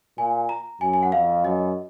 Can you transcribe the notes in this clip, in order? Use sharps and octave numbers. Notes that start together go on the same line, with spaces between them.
A#2 G#5
A#5
F#2 G#5
G#5
F#5
F2 F5
F#2 D#5